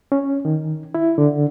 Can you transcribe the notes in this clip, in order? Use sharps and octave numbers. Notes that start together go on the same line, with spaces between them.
C#4
D#3
E4
D3